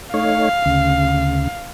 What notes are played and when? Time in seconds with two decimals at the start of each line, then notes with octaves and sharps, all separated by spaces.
0.14 A3 D#4 C#5 F5
0.66 D2 C#3